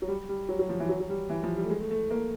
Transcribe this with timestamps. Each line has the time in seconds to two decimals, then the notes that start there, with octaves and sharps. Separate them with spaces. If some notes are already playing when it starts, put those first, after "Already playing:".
0.02 F#3
0.08 G3
0.29 G3
0.49 F#3
0.59 F#3
0.69 F3
0.80 E3
0.89 F#3
1.00 F#3
1.09 G3
1.29 E3
1.43 F3
1.56 G3
1.64 A3
1.70 G#3
1.80 A3
1.91 A3
2.10 A#3